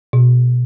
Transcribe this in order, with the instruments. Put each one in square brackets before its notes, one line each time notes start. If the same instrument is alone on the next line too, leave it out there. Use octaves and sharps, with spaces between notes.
[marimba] B2